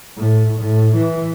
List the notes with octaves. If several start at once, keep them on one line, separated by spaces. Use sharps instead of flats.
A2
A2
E3